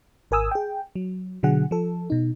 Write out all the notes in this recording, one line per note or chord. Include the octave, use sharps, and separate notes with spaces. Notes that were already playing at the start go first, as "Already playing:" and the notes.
G#1 A#4 G#5 D#6 E6
G#4 G5
F#3
B2 D3 F#3 G#4 F#5
F3 A4
B2 D#4